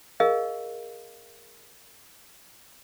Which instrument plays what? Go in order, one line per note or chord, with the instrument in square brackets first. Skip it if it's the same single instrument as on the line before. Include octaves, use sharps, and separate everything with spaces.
[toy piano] G#4 A#4 D#5 F5